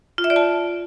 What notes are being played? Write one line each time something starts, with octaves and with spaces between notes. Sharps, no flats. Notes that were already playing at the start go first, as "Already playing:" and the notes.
F4
E5
D5
A5